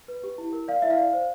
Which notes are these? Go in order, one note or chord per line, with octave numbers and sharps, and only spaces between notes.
B4
G4
E4
A#4
D5 F5
E4 E5
F5
D5
C5